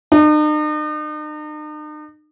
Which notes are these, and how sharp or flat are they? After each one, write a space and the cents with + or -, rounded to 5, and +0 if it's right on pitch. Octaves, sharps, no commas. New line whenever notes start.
D#4 -45